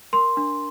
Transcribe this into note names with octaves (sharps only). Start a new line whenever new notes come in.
A#4 C6
D4